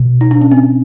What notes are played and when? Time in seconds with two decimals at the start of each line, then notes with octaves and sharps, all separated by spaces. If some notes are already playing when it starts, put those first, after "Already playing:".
Already playing: B2
0.21 D#4
0.31 D4
0.41 C#4
0.51 C4